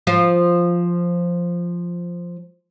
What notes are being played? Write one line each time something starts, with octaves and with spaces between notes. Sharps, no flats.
F3 F4 C5